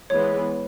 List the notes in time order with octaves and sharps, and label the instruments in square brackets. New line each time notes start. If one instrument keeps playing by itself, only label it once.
[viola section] E3 G#3 B3 [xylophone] C#5